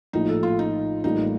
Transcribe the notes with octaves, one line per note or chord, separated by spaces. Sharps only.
A#1 A2 F3 D#4
A4
F4
D#4
A1 A2 G3 A#3 D#4 F4